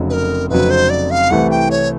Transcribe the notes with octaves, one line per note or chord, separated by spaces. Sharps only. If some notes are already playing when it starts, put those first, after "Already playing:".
Already playing: F1 F2 C#3 F#3
B4
A#4
F1 F2 C#3 F#3 B4
C5
D5
F5
C2 C3 E3 A3 F#5
G5
C#5